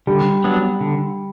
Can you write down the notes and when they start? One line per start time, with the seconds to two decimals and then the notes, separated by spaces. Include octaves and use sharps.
0.07 D3 G3
0.44 F#3 B3 D4
0.81 D3